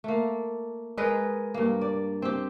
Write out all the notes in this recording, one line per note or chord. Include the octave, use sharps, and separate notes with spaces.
A3 A#3
G#3 A#4 B4 D#5
G2 A#3
D5
C4 G4